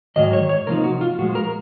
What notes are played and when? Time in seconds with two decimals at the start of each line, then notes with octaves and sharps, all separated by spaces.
0.16 G#2 D#3 F#3 D#5
0.33 C#5
0.49 C#5
0.67 C3 F3 A#3 D#4 A#4
0.84 F#4
1.01 F4
1.18 A#2 F3 G#3 F#4
1.35 A#4